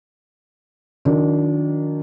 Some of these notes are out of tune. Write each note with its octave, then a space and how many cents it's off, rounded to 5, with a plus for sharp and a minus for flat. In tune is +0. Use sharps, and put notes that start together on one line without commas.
D#3 -10 F#3 -35 D4 -25